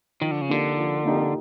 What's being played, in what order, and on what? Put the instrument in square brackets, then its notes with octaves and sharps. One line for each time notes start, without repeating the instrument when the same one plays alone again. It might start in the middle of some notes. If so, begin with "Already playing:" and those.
[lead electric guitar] D#3 [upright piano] F3
[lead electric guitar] D3
C#3
[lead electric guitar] D3 [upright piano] A#3 D#4 G4
[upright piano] F3
A#3 D#4 G4